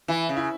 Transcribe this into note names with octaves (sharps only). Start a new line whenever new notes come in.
E3 E4
C#3
E4